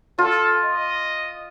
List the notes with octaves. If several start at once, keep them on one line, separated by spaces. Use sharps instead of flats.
F4 A4
D#5